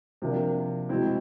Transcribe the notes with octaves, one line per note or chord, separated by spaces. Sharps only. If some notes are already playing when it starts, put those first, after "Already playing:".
C3 F3 A#3 D4
B2 G#3 C4 E4